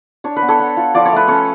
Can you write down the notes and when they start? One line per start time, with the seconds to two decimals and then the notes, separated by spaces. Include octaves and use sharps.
0.24 D4 C#5
0.36 B4
0.42 B3
0.49 A4 C#5
0.60 B3
0.77 F4
0.95 F3 D5
1.06 C#5
1.13 A3 B4
1.28 C#4 A4 C#5